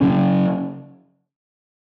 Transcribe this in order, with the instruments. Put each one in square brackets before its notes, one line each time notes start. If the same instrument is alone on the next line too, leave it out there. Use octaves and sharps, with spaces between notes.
[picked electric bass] C#3 F#3 C#4